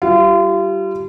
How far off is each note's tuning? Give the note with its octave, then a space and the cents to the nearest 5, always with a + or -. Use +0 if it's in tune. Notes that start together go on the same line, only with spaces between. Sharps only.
G3 -25 F4 -35